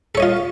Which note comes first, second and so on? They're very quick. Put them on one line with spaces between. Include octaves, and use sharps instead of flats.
A4 C#5 D#5 F4